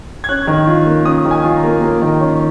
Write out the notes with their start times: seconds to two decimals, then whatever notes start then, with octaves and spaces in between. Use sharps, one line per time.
0.24 G#6
0.29 C#4 F#6
0.47 D#3
0.67 F4
0.86 A#3
1.05 C#4 D#6
1.25 D#3
1.31 G#5
1.44 F4
1.57 A#5
1.63 A#3
1.82 A#3
2.02 D#3
2.20 C#4